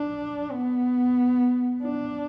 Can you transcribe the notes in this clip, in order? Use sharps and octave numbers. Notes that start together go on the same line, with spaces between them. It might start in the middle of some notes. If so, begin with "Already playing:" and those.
Already playing: D4
B3
D4